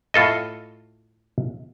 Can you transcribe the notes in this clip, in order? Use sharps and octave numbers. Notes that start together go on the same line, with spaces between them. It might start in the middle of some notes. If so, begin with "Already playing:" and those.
A2 F4 A4 D#5